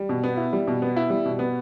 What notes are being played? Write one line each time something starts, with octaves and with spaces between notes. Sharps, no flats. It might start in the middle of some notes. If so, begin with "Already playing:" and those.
Already playing: G3
B2
B3
E4
G3
B2
B3
E4
G3
B2
B3